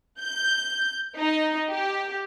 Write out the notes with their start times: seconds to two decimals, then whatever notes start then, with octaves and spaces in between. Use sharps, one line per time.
0.21 G6
1.17 D#4
1.70 G4